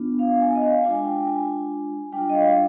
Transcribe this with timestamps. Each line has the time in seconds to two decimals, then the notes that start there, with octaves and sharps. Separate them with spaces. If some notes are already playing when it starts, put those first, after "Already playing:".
Already playing: B3 D4 F4
0.19 F5
0.41 G#5
0.55 D#5
0.62 F5
0.84 G#3 D4 F4 G#5
1.05 G5
1.27 G#5
2.13 G3 D4 F4 G5
2.29 D#5
2.33 F5